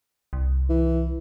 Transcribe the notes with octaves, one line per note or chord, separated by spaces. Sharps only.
C2
E3